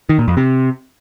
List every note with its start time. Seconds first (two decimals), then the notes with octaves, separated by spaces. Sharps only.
0.09 D#3
0.19 A#2
0.28 F2
0.37 C3